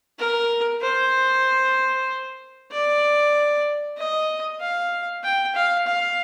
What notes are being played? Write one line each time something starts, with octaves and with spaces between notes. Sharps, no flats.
A#4
C5
D5
D#5
F5
G5
F5
F5